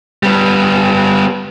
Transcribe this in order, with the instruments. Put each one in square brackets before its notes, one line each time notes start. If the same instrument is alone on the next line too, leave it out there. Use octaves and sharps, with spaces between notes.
[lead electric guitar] G3 B3